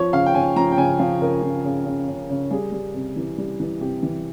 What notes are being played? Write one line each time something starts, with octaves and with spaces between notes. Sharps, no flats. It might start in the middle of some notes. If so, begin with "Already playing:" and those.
Already playing: F3 C#5
C#3 F5
G5
C#3 G#5
F3 A#5
G5
C#3 G#5
F3 F5
C#3 A#4
F3
C#3
C#3
C#3
C#3
G3 G#4
G3
C3
E3
G3
E3
C3 G4
E3